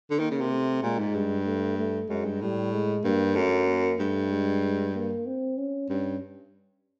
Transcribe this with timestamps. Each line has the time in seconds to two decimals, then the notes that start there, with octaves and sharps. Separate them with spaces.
0.11 D3
0.19 D#3 A#3
0.31 C#3
0.41 C3
0.51 A3
0.83 A#2 G#3
0.99 G#2
1.14 G2
1.46 A3
1.78 A3
2.09 F#2 G#3
2.25 G2
2.41 A2 G3
2.73 G#3
3.04 G2 A#3
3.36 F#2 A3
3.68 A#3
3.99 G2 A3
4.31 G#3
4.95 A#3
5.26 C4
5.58 C#4
5.89 G2 C#4